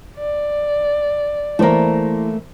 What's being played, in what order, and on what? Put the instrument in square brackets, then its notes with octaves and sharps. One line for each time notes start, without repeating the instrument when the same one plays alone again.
[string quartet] D5
[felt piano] E3 C5 A#5 [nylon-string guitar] A3 A#3